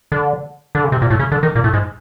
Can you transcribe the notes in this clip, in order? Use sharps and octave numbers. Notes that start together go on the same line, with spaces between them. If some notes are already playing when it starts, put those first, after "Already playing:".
D3
D3
C#3
C3
A#2
A2
C#3
D3
D#3
A#2
A2
G#2